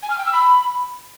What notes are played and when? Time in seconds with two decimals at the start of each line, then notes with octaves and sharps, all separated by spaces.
0.02 G#5
0.10 F6
0.17 G5
0.25 E6
0.33 B5